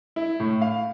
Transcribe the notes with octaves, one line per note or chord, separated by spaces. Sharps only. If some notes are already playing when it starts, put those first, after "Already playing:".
E4
A2
F5